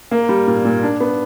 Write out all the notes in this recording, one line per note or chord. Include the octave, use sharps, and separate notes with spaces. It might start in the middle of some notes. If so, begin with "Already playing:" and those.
A#3
G3
A#2
A#2
D4
B3